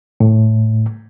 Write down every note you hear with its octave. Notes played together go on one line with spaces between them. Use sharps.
A2